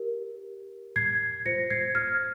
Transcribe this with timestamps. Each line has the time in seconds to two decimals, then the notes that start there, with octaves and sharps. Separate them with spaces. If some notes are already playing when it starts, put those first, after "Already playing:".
Already playing: G4 A#4
0.96 G#6 C7
1.45 F4 C5 A#6 C#7
1.70 G#6 C7
1.95 F6 G#6